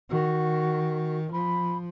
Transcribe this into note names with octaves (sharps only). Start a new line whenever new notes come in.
D#3 F#4
F3 B5